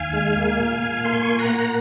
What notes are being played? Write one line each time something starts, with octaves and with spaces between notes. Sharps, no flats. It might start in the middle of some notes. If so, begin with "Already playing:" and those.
Already playing: D#2 F5 G#5
G#3
A#3
A#2
A#2
A#3 G#5 C6
C#6
A#2 C6
F#5 A#5
A#3